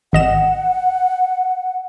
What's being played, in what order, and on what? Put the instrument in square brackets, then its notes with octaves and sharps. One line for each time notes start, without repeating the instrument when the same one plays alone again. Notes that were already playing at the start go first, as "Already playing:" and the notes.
[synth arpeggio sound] G#1 D#5 E7 [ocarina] F#5